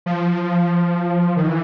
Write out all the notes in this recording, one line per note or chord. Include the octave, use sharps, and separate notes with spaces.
F3
D#3
E3